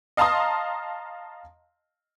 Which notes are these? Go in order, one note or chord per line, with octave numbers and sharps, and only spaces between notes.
D#5 F5 A5 A#5 C6 D#6